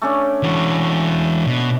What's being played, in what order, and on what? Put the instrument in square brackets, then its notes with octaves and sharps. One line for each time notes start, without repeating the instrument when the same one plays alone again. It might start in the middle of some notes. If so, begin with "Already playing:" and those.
[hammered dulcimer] A3 C#4 D4
[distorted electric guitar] E3 F#4
B2